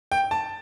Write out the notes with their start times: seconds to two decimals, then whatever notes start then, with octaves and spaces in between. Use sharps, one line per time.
0.12 G5
0.31 A5